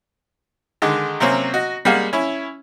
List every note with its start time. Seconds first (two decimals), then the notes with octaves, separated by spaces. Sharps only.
0.82 D3 D#3 G#3
1.20 C3 F#3 A#3 C4 C#4
1.54 F#4 D#5
1.85 G3 G#3 A#3 F5 F#5
2.13 C#4 E4